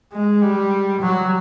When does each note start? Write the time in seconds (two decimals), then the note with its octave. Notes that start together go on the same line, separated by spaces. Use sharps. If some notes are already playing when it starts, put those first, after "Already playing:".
0.13 G#3
0.42 G3
1.01 F#3